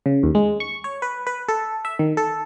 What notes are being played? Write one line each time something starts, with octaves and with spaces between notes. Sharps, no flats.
C#3
D#2
G#3
C#6
C#5
B4
B4
A4
E5
D#3
A4